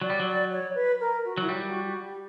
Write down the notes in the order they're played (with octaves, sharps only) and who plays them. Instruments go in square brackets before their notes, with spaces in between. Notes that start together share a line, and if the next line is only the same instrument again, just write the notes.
[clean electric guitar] F#3 [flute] D5
[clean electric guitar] G3
F#3
[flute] D5
C#5
B4
A#4
F#4
[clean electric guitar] F#3 [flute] E4
[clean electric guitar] G3 [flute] F#4
[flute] F#4
F#4
G4